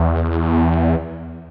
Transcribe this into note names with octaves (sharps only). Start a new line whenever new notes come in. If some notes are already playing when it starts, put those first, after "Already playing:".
Already playing: E2